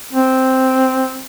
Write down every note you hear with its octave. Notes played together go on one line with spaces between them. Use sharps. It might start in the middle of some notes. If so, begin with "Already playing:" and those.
C4